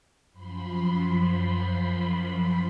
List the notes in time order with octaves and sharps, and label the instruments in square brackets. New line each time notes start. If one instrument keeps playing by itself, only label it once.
[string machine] F#2 F3 B5 C6